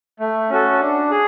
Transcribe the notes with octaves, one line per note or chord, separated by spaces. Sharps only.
A3
C#4 F#4 A4
D4
G#4